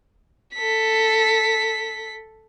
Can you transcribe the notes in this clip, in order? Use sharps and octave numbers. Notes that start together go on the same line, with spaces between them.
A4 B6